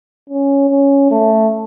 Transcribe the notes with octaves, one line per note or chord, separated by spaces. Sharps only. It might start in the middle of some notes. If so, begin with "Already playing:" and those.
C#4
C#4
A3